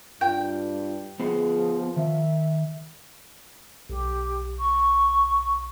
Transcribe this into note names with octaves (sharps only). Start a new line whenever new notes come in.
G2 F4 G5
F3 B3 F4 G#4 C5
D#3 E5
B1 G4
C#6